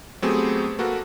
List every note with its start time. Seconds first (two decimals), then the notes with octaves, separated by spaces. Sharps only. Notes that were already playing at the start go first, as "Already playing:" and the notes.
0.22 F#3 A3 B3 C4 G4 G#4
0.79 A#3 F#4 A4 B4